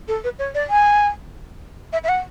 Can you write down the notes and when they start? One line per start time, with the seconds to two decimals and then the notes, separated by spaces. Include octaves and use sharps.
0.08 A4
0.24 B4
0.39 C#5
0.55 D5
0.70 G#5
1.93 E5
2.04 E5
2.09 F#5